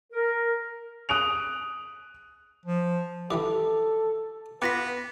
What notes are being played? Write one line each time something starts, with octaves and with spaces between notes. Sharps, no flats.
A#4
D#6 F#6 D7 F7
F3
G2 E3 G3 A4 D6
B3 F4 B4 F5 G5 D6 A#6 B6